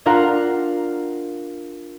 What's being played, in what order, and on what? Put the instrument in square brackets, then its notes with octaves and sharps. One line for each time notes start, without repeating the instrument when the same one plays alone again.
[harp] D4 F4 A#4 F5 F#5 A#5